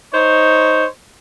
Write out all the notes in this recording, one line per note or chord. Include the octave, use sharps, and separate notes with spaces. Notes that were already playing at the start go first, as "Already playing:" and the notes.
D#4 C5 C#5